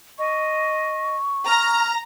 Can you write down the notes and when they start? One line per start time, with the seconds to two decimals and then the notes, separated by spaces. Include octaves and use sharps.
0.19 D#5 C#6
1.48 A#5 F6